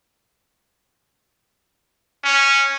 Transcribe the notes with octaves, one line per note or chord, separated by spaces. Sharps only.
C#4